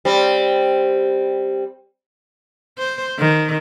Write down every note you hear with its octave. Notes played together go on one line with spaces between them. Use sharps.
G3 C4
C5
D#3